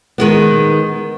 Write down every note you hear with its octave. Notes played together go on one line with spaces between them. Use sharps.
D#3 G#3 B3